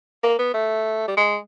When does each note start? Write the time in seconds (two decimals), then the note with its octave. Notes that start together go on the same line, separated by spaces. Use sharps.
0.23 A#3
0.39 B3
0.54 A3
1.08 G3
1.17 G#3